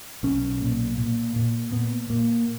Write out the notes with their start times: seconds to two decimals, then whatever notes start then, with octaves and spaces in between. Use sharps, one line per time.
0.23 B1 C#4
0.61 A#2
0.98 A#2
1.36 A#2
1.72 A#2 B3
2.10 A#2 A#3